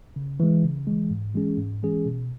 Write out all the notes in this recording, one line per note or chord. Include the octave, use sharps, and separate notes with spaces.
C#3
E3 G#3
C#3
E3 G#3
G#2
E3 G#3 C#4 G#4
G#2
E3 G#3 C#4 G#4
B2